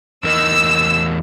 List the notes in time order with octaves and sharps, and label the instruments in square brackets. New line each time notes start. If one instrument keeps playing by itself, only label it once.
[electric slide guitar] E2 A#4 D#5 [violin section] E6